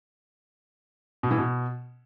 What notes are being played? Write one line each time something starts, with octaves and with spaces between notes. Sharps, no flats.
B2
E3
B2